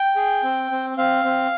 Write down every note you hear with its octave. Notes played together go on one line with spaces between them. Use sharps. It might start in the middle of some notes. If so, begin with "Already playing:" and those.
Already playing: G5
G#4
C4
C4
C4 F5
C4